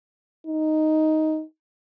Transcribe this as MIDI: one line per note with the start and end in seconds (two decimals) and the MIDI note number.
0.46 1.42 63